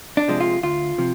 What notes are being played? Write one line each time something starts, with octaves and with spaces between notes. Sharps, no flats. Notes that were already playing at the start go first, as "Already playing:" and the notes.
D4
C3 F3 G#3
F4
D2 F4
C3 F3